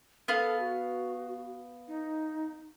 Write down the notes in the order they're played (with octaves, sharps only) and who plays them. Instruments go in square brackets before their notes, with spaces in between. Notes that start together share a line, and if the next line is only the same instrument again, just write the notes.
[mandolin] B3 F5 [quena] A4
[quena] F#4
D#4